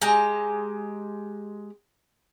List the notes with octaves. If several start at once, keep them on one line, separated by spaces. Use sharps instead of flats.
G#3 G4 A#5